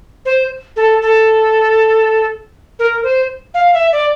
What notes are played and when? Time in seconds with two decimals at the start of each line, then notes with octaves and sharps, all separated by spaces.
0.25 C5
0.76 A4
1.02 A4
2.79 A#4
3.03 C5
3.54 F5
3.73 E5
3.92 D5